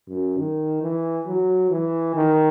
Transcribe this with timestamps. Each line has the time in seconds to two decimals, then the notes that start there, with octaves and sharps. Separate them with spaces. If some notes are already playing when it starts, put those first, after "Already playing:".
0.09 F#2
0.38 D#3
0.82 E3
1.27 F#3
1.71 E3
2.15 D#3